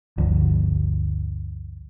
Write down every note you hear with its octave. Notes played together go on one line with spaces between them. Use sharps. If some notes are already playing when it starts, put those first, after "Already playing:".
G1 D2 D3 F3